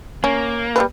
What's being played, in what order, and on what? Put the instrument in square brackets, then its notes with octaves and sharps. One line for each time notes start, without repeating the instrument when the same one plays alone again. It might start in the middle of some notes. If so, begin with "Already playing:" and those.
[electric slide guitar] A#3 [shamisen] C#4
[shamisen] G3 A3 B4